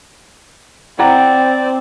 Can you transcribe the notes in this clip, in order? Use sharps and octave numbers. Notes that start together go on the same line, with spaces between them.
C4 E4 D5 F#5 G5 A#5